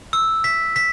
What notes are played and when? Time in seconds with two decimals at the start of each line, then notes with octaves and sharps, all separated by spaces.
0.13 E6
0.44 B6
0.76 B6